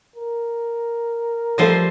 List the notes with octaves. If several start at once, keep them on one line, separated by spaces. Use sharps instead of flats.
A#4
F3 G3 A3 A4 C5 D#5